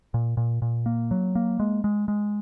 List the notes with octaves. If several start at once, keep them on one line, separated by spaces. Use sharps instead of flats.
A#2
A#2
A#2
A#3
F#3
A#3
G#3
G#3
G#3